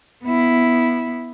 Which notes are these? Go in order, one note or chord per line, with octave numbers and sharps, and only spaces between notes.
B3 E4